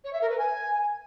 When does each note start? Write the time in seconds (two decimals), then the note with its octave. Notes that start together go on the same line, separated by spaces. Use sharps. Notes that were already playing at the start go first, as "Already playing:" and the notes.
0.04 C#5
0.12 E5
0.21 A#4
0.29 B4
0.38 G#5